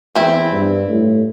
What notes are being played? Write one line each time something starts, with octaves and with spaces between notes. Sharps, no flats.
E2 C4 E4
G2
A2